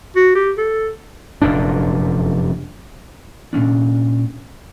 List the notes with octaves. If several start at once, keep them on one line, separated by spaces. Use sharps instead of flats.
F#4
G4
A4
F1 F#2 A#2 D4
A#2 A#3 C#4 D4